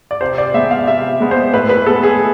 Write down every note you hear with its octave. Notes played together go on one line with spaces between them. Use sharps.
D5
C3 C5
D5
G#3 B3 E5
F5
C3 E5
G#3 B3
C5
A2 B4
B4
G#3 B3 A4
G#4